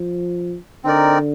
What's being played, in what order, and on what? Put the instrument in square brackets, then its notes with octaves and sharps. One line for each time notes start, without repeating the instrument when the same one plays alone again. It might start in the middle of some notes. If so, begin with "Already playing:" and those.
Already playing: [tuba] F3
[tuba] D3 [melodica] C4 D#4 A#4 D5